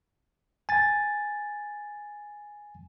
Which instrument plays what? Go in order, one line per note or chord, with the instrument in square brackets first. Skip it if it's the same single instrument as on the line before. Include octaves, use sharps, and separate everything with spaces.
[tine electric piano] G#5 A6